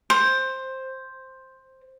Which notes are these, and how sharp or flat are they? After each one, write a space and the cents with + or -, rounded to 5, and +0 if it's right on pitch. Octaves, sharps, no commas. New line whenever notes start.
C5 +5